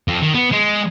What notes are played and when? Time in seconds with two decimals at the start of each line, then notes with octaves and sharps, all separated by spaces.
0.08 F2
0.22 D#3
0.34 B3
0.52 G#3